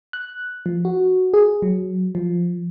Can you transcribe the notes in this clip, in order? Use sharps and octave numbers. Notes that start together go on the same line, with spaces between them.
F#6
F3
F#4
G#4
F#3
F3